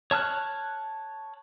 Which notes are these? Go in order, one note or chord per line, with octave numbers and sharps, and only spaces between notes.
C#5 A5 F6 F#6